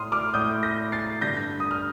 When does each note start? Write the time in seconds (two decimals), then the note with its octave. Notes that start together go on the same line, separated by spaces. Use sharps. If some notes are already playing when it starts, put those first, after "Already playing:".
Already playing: A2 C6 D#6 F6
0.12 D6 F6
0.34 A2 D#6 G6
0.63 G6 A#6
0.92 A6 C7
1.21 G2 D3 G6 A#6
1.60 D#6
1.71 F6